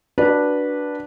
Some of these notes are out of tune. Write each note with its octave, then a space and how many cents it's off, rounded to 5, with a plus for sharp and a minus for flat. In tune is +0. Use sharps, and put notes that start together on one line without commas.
D4 +0 F#4 +0 B4 -15